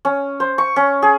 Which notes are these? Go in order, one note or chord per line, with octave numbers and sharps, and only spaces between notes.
C#4
C5
C#6
C#4
G#4